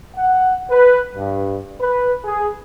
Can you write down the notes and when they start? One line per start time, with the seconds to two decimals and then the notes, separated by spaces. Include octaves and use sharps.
0.15 F#5
0.70 B4
1.15 G2
1.79 B4
2.24 G#4